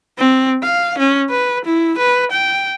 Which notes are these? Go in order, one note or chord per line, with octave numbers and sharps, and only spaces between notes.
C4
F5
C#4
B4
E4
B4
G5